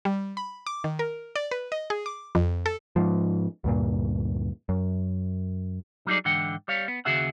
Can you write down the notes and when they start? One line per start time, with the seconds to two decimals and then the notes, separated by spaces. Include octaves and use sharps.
0.05 G3
0.37 B5
0.67 D6
0.84 D#3
0.99 A#4
1.36 D5
1.51 B4
1.72 D#5
1.90 G#4
2.06 D6
2.35 F2
2.66 A4
2.96 G#2 F3
3.64 D2 G2 A#2
4.69 F#2
6.07 F#3 G3 D#4 F4 G#4 D5
6.25 G#2 D3 E3 F#5 G5
6.68 G3 C#5 F5
6.88 B3
7.05 D#2 C#3 F#4 G#4 E5 F#5